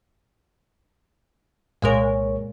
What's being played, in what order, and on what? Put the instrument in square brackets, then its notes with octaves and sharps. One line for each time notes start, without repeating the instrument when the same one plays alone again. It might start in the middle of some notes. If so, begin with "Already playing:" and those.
[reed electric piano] C2 C#5 [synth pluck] A#2 G#3 A#4